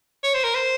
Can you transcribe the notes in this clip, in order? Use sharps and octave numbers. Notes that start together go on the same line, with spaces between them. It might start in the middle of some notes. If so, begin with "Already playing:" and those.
C#5
C5
A#4
C5